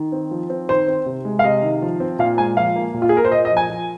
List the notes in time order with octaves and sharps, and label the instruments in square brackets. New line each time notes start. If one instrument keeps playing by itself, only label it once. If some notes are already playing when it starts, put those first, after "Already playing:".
Already playing: [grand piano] D#3
C4
F3
C4
[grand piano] D#3 [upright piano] C5
[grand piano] C4
C3
G#3
[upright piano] F5
[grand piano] C3 [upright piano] D#5
[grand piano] D#3
F3
C4
[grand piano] A#2 [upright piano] F5
[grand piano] G#3 [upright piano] G#5
[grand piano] F3 [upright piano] F5
[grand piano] A#3
A#2
[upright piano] F4
G#4
[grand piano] A#3 [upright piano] A#4
[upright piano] C5
[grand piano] A#2 [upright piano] D#5
[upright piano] D#5
[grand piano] F3
[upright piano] G#5
[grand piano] F3